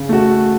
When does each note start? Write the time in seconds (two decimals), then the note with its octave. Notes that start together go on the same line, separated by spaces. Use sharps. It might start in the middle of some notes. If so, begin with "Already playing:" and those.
Already playing: C#3
0.09 A3 F#4